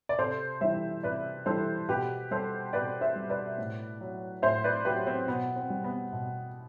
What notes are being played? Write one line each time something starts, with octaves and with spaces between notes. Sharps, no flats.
D5
C3 A4 C5
E3 G3 C5 E5
C3 B4 D5
E3 G3 A4 C5
B2 G4 B4
G3 A4 C5
B2 B4 D5
C5 E5
G3
B4 D5
A2
F#3
A2 C5 E5
B4 D5
F#3 G4 B4
C4
B2 B3
C4
G3
B3
B2